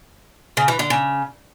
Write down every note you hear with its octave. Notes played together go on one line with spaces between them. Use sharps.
C#3
E3
D3
C#3